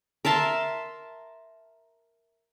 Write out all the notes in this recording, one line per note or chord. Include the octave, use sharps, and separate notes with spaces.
A#4 E5 A5 C6